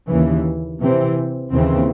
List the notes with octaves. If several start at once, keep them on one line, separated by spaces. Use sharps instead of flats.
D#2 C#3 E3
C3 E3 C4
D#2 C#3 E3 C4